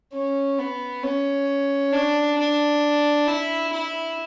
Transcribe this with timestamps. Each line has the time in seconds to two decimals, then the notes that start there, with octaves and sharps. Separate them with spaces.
0.13 C#4
0.58 B3
1.03 C#4
1.93 D4
2.38 D4
3.28 E4
3.72 E4